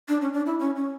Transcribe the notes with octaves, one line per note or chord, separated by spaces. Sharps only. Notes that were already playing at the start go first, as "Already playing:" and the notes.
D4
C#4
D4
E4
C#4
C#4